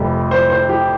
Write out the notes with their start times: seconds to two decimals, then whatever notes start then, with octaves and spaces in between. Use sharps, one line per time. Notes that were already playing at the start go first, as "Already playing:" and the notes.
Already playing: F1 F2 C3 G3
0.31 C5
0.50 C5
0.69 G4